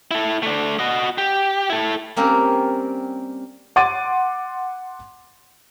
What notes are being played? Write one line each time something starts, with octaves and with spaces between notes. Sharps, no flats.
E4 A4
A3 D4
F#4 D#5
G4
E4 A4
G3 A#3 C4 C#4 A#4
F#5 C6 D6 A6 D#7